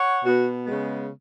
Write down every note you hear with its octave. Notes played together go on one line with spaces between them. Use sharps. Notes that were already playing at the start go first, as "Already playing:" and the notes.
Already playing: C#5 F#5
B2 B3 F#4
C#3 G#3 B3